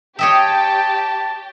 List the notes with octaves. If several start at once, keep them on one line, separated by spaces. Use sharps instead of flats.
G4 C#5 D#5 E5 G5 A5